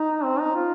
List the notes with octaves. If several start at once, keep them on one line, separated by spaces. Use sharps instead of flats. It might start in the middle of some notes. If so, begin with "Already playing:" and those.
Already playing: D#4
C4
D#4
F4